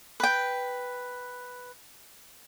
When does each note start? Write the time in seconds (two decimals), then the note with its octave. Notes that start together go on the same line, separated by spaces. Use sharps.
0.20 B4 G5